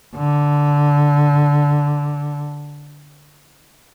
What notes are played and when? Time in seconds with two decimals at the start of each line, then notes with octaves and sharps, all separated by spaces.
0.16 D3